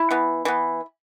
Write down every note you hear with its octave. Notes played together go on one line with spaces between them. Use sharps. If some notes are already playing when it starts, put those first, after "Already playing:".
Already playing: E4
E3 B3
E3 B3